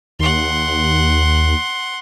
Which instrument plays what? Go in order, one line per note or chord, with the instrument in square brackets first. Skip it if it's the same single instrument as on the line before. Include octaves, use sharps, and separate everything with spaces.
[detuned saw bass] D#2 [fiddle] F#5 C6